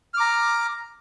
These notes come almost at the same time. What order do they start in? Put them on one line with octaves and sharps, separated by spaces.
F6 D6 A#5